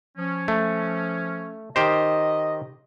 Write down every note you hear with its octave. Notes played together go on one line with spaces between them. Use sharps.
F3 C#4
A3
D#3 G4 C5 D#5